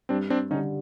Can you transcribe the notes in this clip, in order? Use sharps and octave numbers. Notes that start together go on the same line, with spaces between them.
G2 C4 D4
C4 D4
D3 G3 C#4 D#4